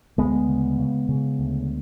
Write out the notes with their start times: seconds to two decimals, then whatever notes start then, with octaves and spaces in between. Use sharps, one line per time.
0.18 D2 G#3 B3
0.49 C#3
0.78 C#3
1.09 C#3
1.39 D2